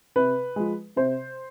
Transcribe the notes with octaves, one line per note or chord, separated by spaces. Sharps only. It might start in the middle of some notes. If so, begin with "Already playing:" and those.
C3 B4
F3 G#3
C3 C5